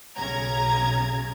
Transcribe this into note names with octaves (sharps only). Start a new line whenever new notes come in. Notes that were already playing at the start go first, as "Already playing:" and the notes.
B1 C#3 A#5 G#6